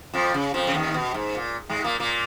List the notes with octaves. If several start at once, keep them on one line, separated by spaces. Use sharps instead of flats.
F2 F3
C#3
F2 F3
C#3
D#2 D#3
B2
G#2
A#2
G#2 G#3
A#2 A#3
A#2 A#3